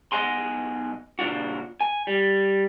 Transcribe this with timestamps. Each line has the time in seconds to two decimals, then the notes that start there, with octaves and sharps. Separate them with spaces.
0.12 B1 F#3 D#5 F#5 G#5 C6
1.19 A#2 C#3 D4 F4 F#4
1.81 G#5
2.07 G3